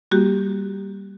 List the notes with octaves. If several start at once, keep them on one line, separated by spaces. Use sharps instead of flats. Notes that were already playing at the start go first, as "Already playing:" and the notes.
G3 A#3 F#4 G4